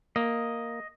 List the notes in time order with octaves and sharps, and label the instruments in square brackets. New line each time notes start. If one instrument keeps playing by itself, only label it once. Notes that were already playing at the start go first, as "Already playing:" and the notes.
[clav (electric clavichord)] A#3 [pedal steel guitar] D#5